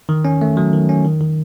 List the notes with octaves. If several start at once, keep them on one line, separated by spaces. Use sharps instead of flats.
D#3
C#4
A3
F#3
D#3
C#4
D#3
D#3